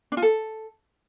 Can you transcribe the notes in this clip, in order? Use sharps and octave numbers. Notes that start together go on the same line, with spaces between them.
D4
F4
A4